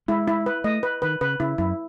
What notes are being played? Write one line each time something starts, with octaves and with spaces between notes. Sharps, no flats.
G#3 E4
E4
B4
A3 D#5
B4
D#3 B4
C#3 B4
C#3 E4
F#2 E4